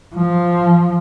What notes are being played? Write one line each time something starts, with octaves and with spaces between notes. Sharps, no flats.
F3